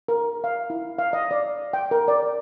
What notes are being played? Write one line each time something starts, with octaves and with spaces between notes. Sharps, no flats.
A#4
F5
E4
F5
D#5
D5
G5
A#4
D5